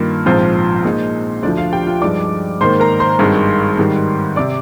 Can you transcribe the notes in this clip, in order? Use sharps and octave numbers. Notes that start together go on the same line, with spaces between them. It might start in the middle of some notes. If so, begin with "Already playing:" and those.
Already playing: G2 D#3 A#3 F4
A#1 G#2 F3 C4 F4 C5
A#2 G#3 D#4
D2 D3 F3 D4 D5
F4 F5
G4 G5
F4 F5
G2 F3 G#3 D#4 D5 D6
G#2 D#3 A#3 C5 C6
A#4 A#5
C5 C6
G#1 G2 D#3 G#3
G#2 D#3 G3
C3 D5 D6